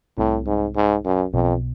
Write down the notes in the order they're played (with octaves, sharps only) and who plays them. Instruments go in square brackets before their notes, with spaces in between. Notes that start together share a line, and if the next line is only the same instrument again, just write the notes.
[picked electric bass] C2 C3 [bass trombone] A2
[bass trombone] G#2
G#2
F#2
[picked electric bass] B1 B2 [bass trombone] F2